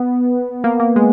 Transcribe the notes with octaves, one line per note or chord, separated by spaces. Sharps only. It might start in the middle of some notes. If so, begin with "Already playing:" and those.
Already playing: B3
A#3
A#3
G#3